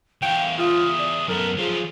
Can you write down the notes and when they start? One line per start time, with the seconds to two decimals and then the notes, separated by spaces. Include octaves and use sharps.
0.22 E2 C#5 F5 G5
0.58 F4 D#6
0.99 D5
1.28 F#2 B3 A4 A#4
1.57 F3 F#3 F4 G#4